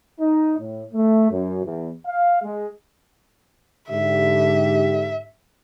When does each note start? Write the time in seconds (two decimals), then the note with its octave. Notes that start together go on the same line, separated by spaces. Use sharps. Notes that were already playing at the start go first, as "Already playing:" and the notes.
0.20 D#4
0.58 A2
0.94 A3
1.30 F#2
1.65 E2
2.06 F5
2.42 G#3
3.90 G#2 D3 G4 E5